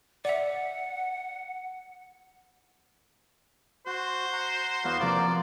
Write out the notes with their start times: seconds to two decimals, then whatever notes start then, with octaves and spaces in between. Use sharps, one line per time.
0.25 D5 E5 F#5
3.86 F#4 C5 F#6
4.33 F#5 A#5
4.84 E2 B3 F#4 F5
5.00 C3 F3 A#3 F4 A#4 D5 A#5